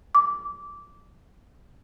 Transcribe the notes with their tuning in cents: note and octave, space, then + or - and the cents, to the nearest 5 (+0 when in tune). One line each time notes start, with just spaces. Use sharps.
D6 -15